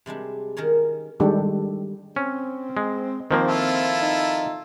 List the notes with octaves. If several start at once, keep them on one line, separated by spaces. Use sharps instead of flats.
C3 G3 G#3 D4
D#3 C#4 A#4 C#5
D#3 G3 G#3 D4 G4 A4
C4 C#4
G#3
D#3 F3 A#3 C4
E4 F4 A4
D#4